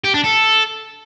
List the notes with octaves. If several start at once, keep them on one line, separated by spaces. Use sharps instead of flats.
G4
D4
A4